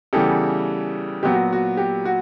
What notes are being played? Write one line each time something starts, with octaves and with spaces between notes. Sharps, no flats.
C#3 E3 G3 B3 G4 A4
A#2 F#3 B3 G4
F#4
F#4
G4
F#4